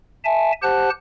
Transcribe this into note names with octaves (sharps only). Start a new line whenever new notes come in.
E5 G#5 A5
G4 C5 F#5 A5 F#6